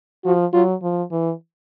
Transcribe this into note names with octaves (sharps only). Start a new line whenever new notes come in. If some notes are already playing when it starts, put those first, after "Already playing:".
F3 F#4
F#3 F4
F3
E3